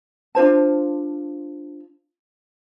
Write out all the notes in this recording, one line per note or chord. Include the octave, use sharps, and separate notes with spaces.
D4 F4 C5 A5